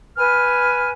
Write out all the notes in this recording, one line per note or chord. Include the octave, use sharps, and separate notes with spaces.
B4 G#5 F6